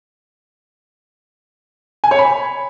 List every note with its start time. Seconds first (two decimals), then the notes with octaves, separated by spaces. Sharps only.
2.04 G#5
2.11 C#5
2.19 B5